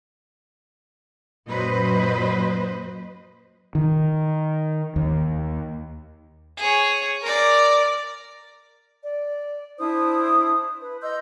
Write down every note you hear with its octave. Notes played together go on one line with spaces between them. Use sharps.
F#2 A#2 F#3 B4 C5 D#5
D#3
D#2
G#4 C#5
A#4 D5
D5
D4 E4 C5 D#6
B4
D#5 C6 E6 G6